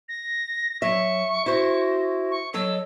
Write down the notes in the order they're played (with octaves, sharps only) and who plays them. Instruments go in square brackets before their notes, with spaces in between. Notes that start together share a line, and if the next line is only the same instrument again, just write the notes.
[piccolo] A#6
[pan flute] F#3 [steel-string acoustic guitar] E5 [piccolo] C#6
[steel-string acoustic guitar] E4 C5 [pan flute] F#4
[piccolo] C#6
[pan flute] F#3 [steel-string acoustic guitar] A4 D#5 [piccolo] E6